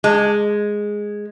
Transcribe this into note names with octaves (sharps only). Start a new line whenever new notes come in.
G#3